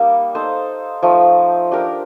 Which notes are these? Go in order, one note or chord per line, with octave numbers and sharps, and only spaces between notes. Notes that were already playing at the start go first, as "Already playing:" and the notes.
Already playing: G3 A#3 D#4 A#4
D#4 A4 C5
F3 A3 D#4
D4 G4 A#4